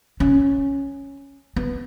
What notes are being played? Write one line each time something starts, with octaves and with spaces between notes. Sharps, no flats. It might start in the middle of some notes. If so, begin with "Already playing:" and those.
C#4
B3